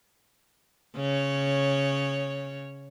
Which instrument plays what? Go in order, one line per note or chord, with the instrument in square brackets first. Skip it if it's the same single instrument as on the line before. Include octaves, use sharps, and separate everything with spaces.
[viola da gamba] C#3 C#5